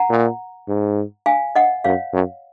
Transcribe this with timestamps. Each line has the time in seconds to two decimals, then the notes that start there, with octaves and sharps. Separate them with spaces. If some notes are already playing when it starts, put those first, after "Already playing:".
Already playing: F#5 A#5
0.10 A#2
0.68 G#2
1.26 F5 G#5
1.55 D#5 F#5
1.84 F#2 C#5 F5
2.13 F#2